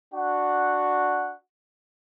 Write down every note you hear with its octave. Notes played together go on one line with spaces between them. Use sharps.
D4 F#4 F#5